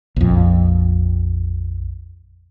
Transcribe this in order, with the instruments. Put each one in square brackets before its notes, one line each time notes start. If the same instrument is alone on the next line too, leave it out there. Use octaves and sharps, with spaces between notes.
[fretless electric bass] A#1 F2